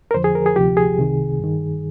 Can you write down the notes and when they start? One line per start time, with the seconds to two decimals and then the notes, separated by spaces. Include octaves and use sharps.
0.11 A#4
0.14 F2 D3 F3 C5
0.24 G#4
0.35 A#4
0.46 G#4
0.56 D2 C3 F3 G4
0.77 G#4
0.98 C2 C3 D#3
1.40 G2 D#3